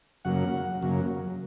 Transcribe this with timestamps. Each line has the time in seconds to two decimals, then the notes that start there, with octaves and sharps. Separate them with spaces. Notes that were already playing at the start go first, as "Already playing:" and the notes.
0.25 F#2 C#3 F#3 A#3 F#5
0.81 F#2 C#3 F#3 A#3